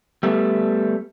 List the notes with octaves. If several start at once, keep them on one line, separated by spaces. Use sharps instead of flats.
G3 A3 B3